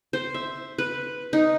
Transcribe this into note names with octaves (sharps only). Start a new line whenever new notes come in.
C5
E5
B4
D#4